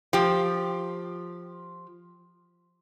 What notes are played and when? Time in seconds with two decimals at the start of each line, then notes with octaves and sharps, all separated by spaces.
0.13 F3 G4